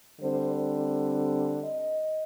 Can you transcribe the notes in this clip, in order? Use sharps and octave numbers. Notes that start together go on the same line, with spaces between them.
D3 G3 C4 C5
D#5